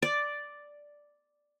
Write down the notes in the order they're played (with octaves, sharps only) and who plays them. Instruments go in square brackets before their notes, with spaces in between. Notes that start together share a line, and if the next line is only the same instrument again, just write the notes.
[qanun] D5